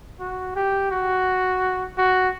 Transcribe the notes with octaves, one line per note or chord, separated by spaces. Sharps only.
F#4
G4
F#4
F#4